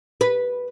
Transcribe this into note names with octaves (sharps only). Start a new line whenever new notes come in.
B4